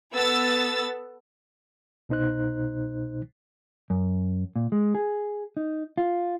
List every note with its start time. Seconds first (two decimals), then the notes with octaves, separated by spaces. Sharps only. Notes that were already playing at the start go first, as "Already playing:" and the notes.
0.13 B3 A4 E6 A6
2.09 C2 B2 D#4 C5 F#6
3.90 F#2
4.56 A#2
4.72 G#3
4.95 G#4
5.57 D#4
5.98 F4